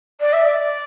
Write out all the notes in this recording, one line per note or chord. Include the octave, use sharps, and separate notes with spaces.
D5
E5
D5